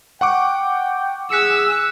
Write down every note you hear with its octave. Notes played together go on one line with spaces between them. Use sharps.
F#5 G5 C#6 D6
G#4 E6 F#6 B6 C#7